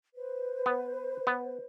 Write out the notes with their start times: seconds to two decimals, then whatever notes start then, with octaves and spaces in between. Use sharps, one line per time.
0.15 B4 C5
0.66 B3
1.27 B3